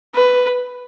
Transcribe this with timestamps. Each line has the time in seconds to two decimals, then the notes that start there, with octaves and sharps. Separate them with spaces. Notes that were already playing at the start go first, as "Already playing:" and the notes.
0.15 B4